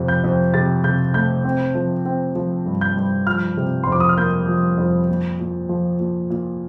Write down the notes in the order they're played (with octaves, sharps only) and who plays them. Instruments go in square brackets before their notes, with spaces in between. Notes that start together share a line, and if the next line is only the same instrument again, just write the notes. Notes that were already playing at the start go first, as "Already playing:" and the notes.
Already playing: [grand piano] F2 C3
G6
F2
C3 A6
C3 G6
A3 G6
C4
F3
C4
F3
G2
G6
G2
F3 F6
C3
C6
F2 D6
D#6
F6
A#3 G6
F3
F2
A#2
A#2
F3
A#2
A#2